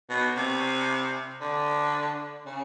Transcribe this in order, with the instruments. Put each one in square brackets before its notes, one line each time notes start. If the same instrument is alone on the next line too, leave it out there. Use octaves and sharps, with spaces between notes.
[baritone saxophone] B2
C3
D3
C#3